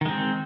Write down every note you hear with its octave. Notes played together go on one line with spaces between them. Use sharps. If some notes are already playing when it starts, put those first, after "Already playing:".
D#3 G#3 C4